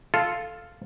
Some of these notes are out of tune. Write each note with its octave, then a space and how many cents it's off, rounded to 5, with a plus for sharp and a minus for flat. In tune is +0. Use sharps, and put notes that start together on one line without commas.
F4 +0 A4 +0